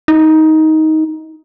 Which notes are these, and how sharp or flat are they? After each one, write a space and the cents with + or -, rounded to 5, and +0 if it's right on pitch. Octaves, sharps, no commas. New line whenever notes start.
D#4 +15